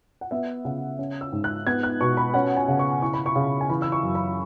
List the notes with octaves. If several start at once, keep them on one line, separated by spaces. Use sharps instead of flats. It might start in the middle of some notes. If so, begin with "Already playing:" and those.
F#5
B3 E5
C#3 F#5
C#4
E6
G#2
F#6
B3 G#6
F#6
B2 C#6
B5
C#4 F#5
G#5
C#3
C#6
E4 C#6
B5
C#6
C#3
G#5
E3 B5
E6
C#6
F#2
B5